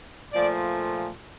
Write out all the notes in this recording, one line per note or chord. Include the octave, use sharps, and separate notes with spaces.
A#2 F3 A3 D5